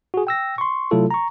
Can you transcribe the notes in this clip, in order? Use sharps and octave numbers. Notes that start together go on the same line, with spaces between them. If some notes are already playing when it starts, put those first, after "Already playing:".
F#4 G#4
G5 E6 A#6
C6 C#6
C3 F#3 A3 E4 F4 A4
A#5 C#6